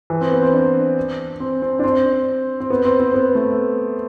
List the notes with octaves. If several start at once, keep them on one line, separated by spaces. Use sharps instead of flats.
E3
C4
B3
C4
D4
C4
C4
D4
C4
C4
B3
C4
C4
B3
A3